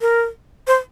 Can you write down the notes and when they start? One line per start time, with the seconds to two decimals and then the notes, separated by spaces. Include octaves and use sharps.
0.01 A#4
0.67 C5